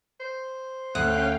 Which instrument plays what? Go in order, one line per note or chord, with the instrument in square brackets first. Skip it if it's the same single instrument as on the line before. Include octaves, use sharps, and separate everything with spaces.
[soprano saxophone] C5
[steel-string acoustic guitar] D2 [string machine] C#4 F5 G5 [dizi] F#6